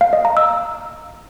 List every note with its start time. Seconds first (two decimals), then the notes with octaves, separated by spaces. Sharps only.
0.01 F5
0.13 D#5
0.25 A#5
0.37 E6